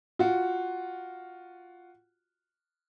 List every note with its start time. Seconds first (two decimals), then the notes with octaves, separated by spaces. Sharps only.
0.19 F4 F#4